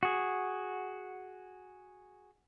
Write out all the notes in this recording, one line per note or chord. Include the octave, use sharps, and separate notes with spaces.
F#4 G#4